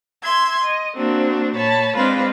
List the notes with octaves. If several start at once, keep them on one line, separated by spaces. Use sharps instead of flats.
E5 C6 G#6
D#5
A#3 C4 D4 F#4
A#2 C#5 A5 B5
G#3 C4 D4 F4 B4 C5